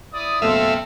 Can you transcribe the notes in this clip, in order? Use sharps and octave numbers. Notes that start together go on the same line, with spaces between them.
E4 D5 D#6
F#1 B2 A3 C4 A4 E5 F5 C6